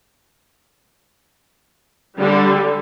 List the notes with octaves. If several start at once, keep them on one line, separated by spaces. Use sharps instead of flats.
D3 G3